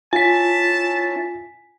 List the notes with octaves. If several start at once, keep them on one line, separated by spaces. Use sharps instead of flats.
C#4 E4 F4 G#5 A5 B6